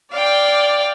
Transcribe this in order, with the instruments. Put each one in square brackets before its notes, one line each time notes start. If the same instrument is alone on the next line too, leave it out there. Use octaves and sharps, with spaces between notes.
[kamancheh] D5 [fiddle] F5 G5